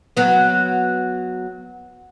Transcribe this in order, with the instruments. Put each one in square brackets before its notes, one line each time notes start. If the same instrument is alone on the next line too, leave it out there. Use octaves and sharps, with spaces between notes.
[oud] F#3 B3